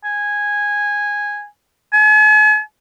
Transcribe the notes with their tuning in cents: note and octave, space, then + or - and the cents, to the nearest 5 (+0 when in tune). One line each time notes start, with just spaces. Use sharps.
G#5 -10
G#5 +45